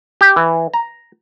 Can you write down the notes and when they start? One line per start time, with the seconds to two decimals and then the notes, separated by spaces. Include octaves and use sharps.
0.21 G4
0.36 E3
0.74 A#5